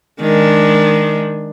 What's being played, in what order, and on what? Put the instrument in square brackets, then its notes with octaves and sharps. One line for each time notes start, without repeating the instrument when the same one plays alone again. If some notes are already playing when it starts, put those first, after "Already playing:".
[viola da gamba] D#3 G#3 D4